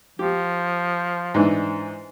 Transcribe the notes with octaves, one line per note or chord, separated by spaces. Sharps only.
F3 G4
G#2 E3 D4